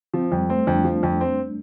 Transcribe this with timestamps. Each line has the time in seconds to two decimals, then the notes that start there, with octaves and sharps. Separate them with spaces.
0.14 F3 C4
0.32 F2 G3
0.49 A3 C4
0.67 F2 D4
0.84 F3
1.03 F2
1.21 C4